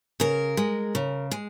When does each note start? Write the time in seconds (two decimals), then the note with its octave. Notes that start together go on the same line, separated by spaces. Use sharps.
0.20 C#3 A#4
0.57 G#3
0.95 C#3
1.31 G#3